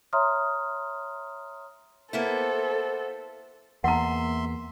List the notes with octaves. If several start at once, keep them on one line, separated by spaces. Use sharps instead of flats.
C#5 E5 A#5 C6 D#6 F6
A#3 B3 E4 A4 C5
E2 A#3 E5 F#5 A#5 C6